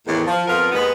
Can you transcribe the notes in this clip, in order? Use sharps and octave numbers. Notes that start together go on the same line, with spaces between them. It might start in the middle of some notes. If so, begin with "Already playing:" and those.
E2 A2 D#3
F3
F2 F3 B3 F4 A#4 F5
D#2 G#3 B3